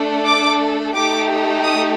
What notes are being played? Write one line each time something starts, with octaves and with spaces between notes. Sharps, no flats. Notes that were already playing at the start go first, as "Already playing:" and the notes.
Already playing: A3 D4 A4
D6
A3 D#4 G4 D6
D#6